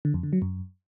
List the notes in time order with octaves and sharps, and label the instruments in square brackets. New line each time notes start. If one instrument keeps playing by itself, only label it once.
[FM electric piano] D3
F2
D3
F#3
F#2